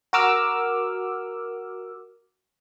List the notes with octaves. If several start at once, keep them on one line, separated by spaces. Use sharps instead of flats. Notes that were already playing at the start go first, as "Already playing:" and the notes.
F#4 A#4 D6 E6 F6